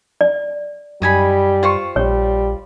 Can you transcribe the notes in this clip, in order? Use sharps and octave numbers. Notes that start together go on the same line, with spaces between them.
D5
F#2 G3 D#4 G#5 B5
F4 C5 C#6
A#1 G3 C#5